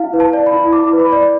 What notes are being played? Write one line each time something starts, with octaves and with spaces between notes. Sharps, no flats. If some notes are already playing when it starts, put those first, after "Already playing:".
Already playing: E4 F5
B4
A5
D5
B5
E4
E4 D6
B4
B5
D5